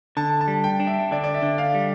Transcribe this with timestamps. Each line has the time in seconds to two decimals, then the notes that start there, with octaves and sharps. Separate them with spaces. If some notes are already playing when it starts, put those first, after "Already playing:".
0.17 D3 A5
0.41 A5
0.48 G3
0.64 G5
0.80 D4
0.87 E5
1.11 D3 D5
1.24 D5
1.34 E5
1.42 D3
1.58 F5
1.74 G3